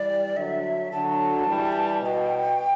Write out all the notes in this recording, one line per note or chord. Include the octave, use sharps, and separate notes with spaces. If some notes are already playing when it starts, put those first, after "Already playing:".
Already playing: E3 G3 D5
D3 F#3 E5
D3 F#3 A5
E3 G3
B2 G5 A5